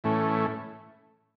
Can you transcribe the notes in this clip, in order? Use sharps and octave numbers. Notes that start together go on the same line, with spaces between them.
A2 E3 A3 C#4